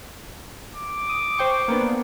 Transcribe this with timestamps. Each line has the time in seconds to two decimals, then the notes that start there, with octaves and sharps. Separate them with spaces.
0.75 D6
1.09 D#6
1.38 C5 G5 C#6
1.68 A#3 B3 D4